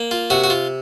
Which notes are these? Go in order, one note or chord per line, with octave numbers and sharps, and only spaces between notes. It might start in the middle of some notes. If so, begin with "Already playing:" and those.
Already playing: A#3
F4
C3 F#4
F#4
F4